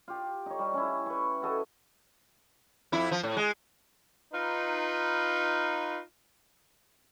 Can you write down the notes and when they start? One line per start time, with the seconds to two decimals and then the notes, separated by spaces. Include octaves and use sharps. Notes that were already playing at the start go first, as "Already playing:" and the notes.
0.08 F4 G4
0.46 D#4 C#5
0.59 G3
0.74 C#4 E4
1.06 B4 C#6
1.42 F#4 A4 D#5 E5
2.92 F2 E4
3.11 F3
3.23 A2
3.37 G#3
4.33 D#4 F4 B4